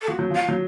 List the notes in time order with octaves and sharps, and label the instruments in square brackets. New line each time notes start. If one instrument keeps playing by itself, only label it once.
[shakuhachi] A4
[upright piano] F3 [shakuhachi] F#4
[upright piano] F#3
[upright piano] F3 [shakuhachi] F5
[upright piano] F#3